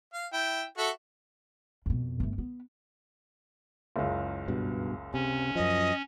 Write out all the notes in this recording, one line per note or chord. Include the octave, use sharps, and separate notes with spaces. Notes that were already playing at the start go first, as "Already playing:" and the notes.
F5
E4 G5
F#4 A4 E5
F2 B2
G1 A3
B3
F#1 C#2
G2 B2
C3 C#4
F#2 F3 D#5